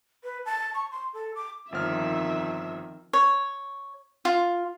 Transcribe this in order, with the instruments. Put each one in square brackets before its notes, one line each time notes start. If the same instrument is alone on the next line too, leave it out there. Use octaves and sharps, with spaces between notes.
[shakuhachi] B4
A5
C#6
C6
A4
D6
[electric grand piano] G1 F3 F6 [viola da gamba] F2 D#3 [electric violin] E5
[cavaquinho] C#5
F4